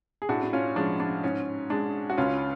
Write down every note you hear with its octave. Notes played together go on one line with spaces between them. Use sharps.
G#4
A2 D4 F#4
D4
C#4 F4
F3 G#3 D4
D4
G#2 C#4
G#3 D4
F#4
C#2 C#4 F4